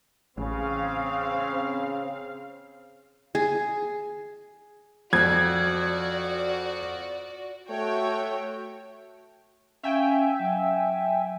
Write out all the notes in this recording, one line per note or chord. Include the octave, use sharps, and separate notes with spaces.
A1 C#3 C4 F5
G#4
F2 F#4 D5 G#6
A3 F#4 C#5 G5
C#4 E5 F5 G5 G#5
F#3